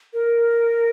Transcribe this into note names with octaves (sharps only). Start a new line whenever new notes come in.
A#4